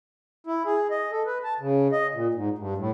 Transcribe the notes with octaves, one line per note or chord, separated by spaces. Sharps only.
E4
G#4
D#5
A4
B4
A5
C#3
D#5
A#2
G#2
G2
A2